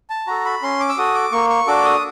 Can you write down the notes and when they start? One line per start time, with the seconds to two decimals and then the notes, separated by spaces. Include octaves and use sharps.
0.10 A5
0.27 F#4 A4 A#5
0.45 B5
0.62 C#4 C6
0.80 D6
0.89 E6
0.97 F#4 A4 D#6
1.15 D6
1.32 A#3 C#6
1.50 C#6
1.67 D4 F#4 A4 D6
1.85 D#6